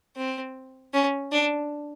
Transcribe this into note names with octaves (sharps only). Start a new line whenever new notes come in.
C4
C#4
D4